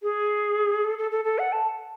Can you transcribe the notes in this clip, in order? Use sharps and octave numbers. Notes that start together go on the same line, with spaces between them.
G#4
A4
A4
A4
A4
F#5
A5